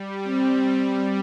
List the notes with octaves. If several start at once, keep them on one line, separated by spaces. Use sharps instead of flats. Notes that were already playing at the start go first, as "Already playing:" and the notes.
Already playing: G3
C4